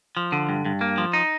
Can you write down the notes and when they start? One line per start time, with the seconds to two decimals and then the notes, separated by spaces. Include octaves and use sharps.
0.17 F3
0.32 D3
0.49 G2
0.65 G2
0.81 A#3
0.98 F3
1.13 D#4